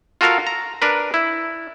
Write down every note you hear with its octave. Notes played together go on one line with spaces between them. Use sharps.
F4 F#4 A4 A#4 F5
A#5
D4 A#4 B4
E4